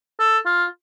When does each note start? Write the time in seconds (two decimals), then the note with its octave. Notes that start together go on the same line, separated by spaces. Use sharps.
0.19 A4
0.46 F4